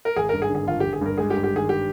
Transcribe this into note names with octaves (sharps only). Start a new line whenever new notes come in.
A#4
G#1 G#4
A#4
G2
G#4
D3
G#4
G#1 F4
G#1 G4
G#4
G2 A#4
G#3 G#4
G4
G2
G4
D#3 G#4
G4